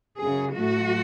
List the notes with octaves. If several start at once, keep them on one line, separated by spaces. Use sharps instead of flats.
F#2 C#3 F#3 G#4
A2 F#3 A3 F#4